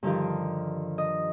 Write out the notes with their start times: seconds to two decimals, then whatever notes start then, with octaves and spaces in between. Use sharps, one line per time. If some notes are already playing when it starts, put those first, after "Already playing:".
0.03 G2 D3 D#3 F3 G4
0.98 D#5